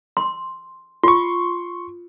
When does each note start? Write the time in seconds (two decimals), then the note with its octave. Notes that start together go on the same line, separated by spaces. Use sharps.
0.17 C6
1.04 F4 C6 C#6